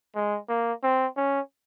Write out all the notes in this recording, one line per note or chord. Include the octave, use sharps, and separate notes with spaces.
G#3
A#3
C4
C#4